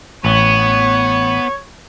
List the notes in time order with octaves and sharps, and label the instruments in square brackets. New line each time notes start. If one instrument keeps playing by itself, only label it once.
[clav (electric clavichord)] A1 [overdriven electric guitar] B3 [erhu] C#5